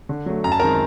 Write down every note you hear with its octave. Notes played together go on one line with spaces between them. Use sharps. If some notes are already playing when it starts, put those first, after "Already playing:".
D3
F#3 A3
F#2 A#5
A5
D#3 G#3 C4 A#4 A#5